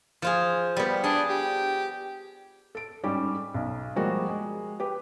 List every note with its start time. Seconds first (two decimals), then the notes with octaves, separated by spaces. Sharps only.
0.22 F3 F4 G#4
0.76 G3 B3
1.04 D4 G#4
1.29 G4
2.75 A4 D7
3.03 G#2 G3 C#4 G4
3.54 B1
3.96 F3 G3 G#3 A#3 F#4
4.29 G#3
4.80 G4 B4